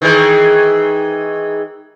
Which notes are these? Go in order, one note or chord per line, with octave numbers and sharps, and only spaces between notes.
D#3 E3 G#3